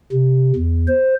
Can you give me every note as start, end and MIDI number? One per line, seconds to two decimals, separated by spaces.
0.12 0.52 48
0.56 0.87 40
0.88 1.15 72